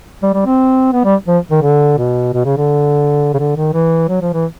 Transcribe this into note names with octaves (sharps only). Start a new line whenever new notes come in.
G3
G3
C4
B3
G3
F3
D#3
D3
B2
B2
C#3
D3
C#3
D3
D#3
E3
F#3
F3
E3